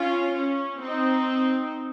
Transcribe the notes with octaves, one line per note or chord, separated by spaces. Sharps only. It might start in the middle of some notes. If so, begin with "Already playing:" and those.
Already playing: C#4 F4
C#4
C4 D#4